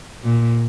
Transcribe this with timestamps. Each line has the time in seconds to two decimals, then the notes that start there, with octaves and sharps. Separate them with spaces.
0.24 A#2